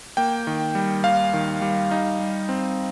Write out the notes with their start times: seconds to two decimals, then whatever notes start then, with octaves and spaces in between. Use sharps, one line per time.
0.17 A#3 G5
0.47 D#3
0.75 G3
1.04 D#2 F5
1.34 D#3
1.62 G3
1.91 D#4
2.20 G3
2.49 C4